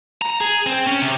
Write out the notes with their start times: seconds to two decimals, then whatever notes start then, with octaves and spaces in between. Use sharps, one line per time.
0.22 A#5
0.40 G#4
0.66 C4
0.87 C#4
1.02 C3